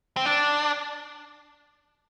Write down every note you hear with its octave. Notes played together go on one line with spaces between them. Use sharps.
C4
D4